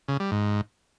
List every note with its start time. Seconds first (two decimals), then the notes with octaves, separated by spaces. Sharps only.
0.08 C#3
0.20 G3
0.32 G#2